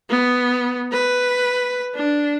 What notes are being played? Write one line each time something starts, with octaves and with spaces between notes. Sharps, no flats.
B3
B4
D4